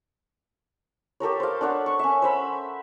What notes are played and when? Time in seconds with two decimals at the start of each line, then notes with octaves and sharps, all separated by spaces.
1.20 G4 A4 A#4 C#5
1.40 C5 F5
1.61 D4 A4 C#5 F#5
1.86 C#6
1.99 C#4 E5
2.22 C5 E5 B5